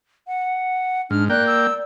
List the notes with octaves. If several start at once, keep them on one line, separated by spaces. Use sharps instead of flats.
F#5
G#2 D4 F6
A#3 D5 G5 F#6
E6